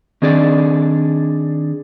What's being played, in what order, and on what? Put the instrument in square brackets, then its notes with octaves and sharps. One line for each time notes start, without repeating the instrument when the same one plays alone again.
[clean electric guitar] D#3 C4 D4 G#4 D5